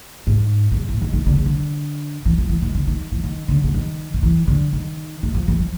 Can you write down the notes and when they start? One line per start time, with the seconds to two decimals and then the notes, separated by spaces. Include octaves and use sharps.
0.27 G#2
0.71 A2
0.77 G#2
0.89 A2
1.02 D#3
1.13 D#3
1.26 D3
1.37 C#3
1.46 D3
2.25 E3
2.38 F3
2.49 E3
2.62 D#3
2.75 D3
2.87 D#3
3.12 E3
3.24 D#3
3.48 D3
3.64 D3
3.74 D#3
4.14 D#3
4.23 E3
4.48 D3
4.73 D#3
5.23 D#3
5.35 F3
5.48 E3
5.59 F3